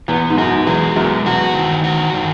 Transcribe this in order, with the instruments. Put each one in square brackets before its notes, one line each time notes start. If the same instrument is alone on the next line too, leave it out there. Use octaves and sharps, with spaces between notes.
[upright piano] E2 [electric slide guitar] B3
[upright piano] G#2
[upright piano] F#2 [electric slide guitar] F#4
[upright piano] E2 [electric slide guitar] G#3
[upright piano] F#2 [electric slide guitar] B3
[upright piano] E2 [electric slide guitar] F#4
[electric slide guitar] D#3
F#4
D#3